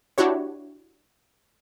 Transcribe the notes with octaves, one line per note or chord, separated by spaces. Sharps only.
D4 E4 F#4 G4 C#5